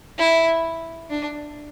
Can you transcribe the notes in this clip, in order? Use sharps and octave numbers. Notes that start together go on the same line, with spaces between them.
E4
D4